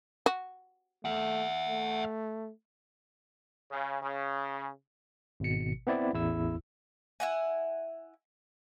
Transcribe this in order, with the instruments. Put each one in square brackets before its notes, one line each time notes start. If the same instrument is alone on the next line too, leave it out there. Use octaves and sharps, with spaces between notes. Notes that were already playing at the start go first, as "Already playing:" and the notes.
[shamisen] F#4
[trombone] A3 [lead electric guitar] E5 F#5
[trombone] A3
[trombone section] C#3
C#3
[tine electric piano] G#1 B2 C#7
B3 C4 E4 D5
A1 E2 E4 E6
[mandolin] E4 F#5 G#5